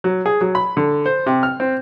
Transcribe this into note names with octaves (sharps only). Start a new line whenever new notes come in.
F#3
G#4
F#3
B5
D3
C5
C3
F6
C4